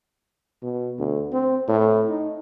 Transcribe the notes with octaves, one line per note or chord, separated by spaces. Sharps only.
B2
D2
C4
A2
D#4